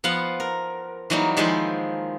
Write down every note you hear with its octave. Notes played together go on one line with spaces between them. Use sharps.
F3 B3 F5 F#5
A#4
E3 F#3 G3 A#3 D#4
D#3 F3 G#3 E4 G#4 C5